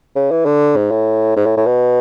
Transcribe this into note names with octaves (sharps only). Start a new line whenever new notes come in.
C#3
E3
D3
G#2
A2
G#2
A2
A2
B2